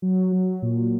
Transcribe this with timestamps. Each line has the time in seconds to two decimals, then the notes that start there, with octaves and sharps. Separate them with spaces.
0.02 F#3
0.32 F#3
0.62 A#2